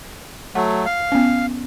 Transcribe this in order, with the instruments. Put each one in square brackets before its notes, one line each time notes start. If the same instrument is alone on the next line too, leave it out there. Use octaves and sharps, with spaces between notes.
[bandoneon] F#3 A3 [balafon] F#5
[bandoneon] F5
[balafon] B3 C#4